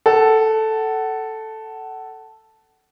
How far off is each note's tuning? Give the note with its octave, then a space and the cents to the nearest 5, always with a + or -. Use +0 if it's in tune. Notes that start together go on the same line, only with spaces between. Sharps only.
A4 +0 F#5 +25